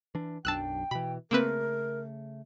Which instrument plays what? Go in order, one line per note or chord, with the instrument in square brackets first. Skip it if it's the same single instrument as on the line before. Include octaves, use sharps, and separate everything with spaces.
[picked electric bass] E3 D4
[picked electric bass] B1 F#2 D4 [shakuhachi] G5 [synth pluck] A5 E6 F#6
[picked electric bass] B2 E3 [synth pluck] B5
[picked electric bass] C#3 A3 [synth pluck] A#3 C4 B4 [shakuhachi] A#4